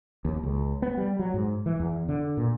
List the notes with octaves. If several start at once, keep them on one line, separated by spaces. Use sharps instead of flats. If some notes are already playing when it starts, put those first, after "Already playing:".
D#2
C#2
B3
G3
F#3
G#2
E3
E2
D3
A#2